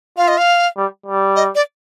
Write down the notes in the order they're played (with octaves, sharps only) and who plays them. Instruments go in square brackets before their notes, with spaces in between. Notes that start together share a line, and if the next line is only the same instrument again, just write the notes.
[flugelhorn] F4 [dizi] F5
[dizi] D#5
F5
[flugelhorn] G3
G3
[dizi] D#5
D5